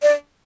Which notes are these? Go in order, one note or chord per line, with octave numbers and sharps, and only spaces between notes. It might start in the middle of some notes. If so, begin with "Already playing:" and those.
D5